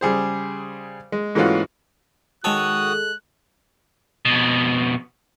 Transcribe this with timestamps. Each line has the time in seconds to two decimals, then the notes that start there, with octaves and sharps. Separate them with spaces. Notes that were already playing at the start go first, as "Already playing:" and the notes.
0.01 C#3 G3 G#4 C5
1.12 G#3
1.35 G#2 E3 A3 C#4 F4 F#4
2.44 D#3 G#3 F#4 A4 C#5 D#6 F#6
4.25 F2 B2